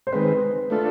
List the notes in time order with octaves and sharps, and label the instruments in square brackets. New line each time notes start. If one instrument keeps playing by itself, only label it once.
[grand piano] C5
[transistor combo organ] D#3 G#3 C4 [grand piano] B4
[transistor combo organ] A3 D4 F4 A4